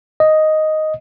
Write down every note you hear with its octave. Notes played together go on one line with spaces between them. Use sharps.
D#5